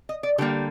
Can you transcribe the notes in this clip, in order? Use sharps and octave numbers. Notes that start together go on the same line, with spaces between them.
D#5
D5
D3 G3 A#3 G4